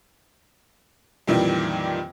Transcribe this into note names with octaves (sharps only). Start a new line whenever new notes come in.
F2 A#2 D#3 E3 G3